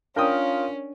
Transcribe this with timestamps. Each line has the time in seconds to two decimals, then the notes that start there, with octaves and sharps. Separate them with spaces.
0.16 C#4 D4 F4 A#4 G5 D#6